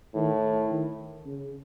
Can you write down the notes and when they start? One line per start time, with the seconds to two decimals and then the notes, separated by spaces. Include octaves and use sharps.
0.15 A2 D#3
0.71 D#3
1.26 C#3